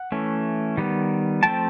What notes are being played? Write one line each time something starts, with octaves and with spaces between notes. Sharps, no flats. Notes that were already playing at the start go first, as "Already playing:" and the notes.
Already playing: F#5
E3 A3 C#4
D#3 G3 B3
F3 A3 C4 G5 A5